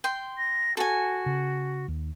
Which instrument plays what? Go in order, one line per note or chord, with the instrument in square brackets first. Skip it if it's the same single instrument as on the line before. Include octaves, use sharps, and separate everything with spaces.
[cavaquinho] G5 C6
[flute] A#6
[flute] F#4 [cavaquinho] A4 G#5
[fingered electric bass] C#3
D#2